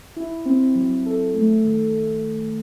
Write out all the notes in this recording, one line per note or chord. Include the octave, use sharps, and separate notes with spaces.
E4
C4
F#3
A4
A3
D#3